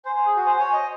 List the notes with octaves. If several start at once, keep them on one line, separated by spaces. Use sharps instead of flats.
C5 G#5
C5
G#4
F#4
C5
C#5
D#5